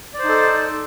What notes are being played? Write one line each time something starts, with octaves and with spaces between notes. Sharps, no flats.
D#4 A4 C5 D5